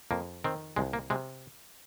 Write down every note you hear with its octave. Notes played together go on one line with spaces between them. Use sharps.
F2 A#3
D#3 C4
C2 G#3
A#3
C3 G#3